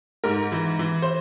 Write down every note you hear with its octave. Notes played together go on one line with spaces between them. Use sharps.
G#2 A#4
E3
E3
C5